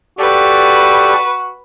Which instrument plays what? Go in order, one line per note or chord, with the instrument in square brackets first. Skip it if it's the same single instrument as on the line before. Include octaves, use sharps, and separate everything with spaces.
[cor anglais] F#4 [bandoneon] G4 A4 D5 [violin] B4